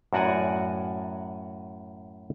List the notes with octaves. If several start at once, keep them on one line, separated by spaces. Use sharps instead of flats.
F#2 A2 F#4 D5 F#5 G#5